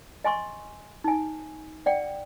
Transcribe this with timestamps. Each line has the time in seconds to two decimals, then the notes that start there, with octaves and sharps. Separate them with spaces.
0.24 D#5 G#5 C6 C#6
1.04 D#4 G#5
1.86 D5 F#5 G5